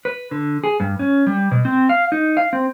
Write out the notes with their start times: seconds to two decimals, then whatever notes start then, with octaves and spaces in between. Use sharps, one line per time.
0.05 B4
0.31 D3
0.64 G#4
0.80 G2
0.99 C#4
1.27 G3
1.51 B2
1.65 C4
1.89 F5
2.12 D#4
2.37 F5
2.53 C4